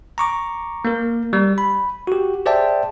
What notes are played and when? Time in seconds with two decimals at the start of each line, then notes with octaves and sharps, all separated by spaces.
0.18 A#5 C#6 D6
0.85 A#3 A#4
1.33 G3
1.58 B5
2.07 F#4 G4
2.46 G#4 C5 D5 E5 G5 A5